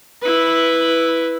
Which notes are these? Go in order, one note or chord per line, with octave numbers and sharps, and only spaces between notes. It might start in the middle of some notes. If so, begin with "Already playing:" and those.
E4 B4